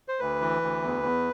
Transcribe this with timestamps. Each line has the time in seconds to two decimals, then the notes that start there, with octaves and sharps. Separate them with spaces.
0.08 C5
0.19 D2 B4
0.41 E3
0.62 D2
0.82 E2
1.03 E2